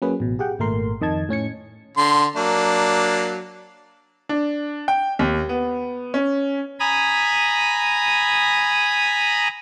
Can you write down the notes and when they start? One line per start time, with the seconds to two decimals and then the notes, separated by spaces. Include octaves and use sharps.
0.02 F#3 A#3 C#4 G#4 B4
0.20 A1 B2
0.39 G4 G#4 F#5 G5
0.59 G#1 A#2 A3 A#4 C6
1.01 F2 D#3 D#5 A5 G#6
1.29 A2 C#4 G#6 C#7
1.97 D3 C6
2.36 F#3 A#3 D4
4.29 D4
4.88 G5
5.19 D#2
5.49 B3
6.14 C#4
6.80 G#5 A#5 B5 D#6